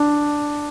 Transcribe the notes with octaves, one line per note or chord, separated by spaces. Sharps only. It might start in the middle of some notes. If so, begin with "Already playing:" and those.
Already playing: D4